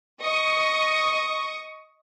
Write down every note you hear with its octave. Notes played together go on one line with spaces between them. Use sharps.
D#5 C#6 D#6